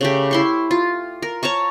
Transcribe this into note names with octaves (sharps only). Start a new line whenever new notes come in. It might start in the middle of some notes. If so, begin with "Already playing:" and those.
C#3 A3 G4
E4 C6 C#6
F4
A#4
C#5 A5 A#5 C#6